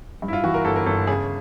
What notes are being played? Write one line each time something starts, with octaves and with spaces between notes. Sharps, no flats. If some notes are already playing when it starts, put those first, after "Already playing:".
G2
E4
F4
E3 F#4
A#4
G1 A4
A#4
G1 A4
C#3 G#4